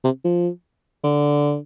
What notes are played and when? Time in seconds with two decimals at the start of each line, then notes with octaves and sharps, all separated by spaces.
0.04 C3
0.25 F3
1.04 D3